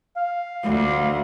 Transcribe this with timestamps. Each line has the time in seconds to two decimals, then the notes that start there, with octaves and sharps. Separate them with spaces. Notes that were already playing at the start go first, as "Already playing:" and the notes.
0.16 F5
0.64 D2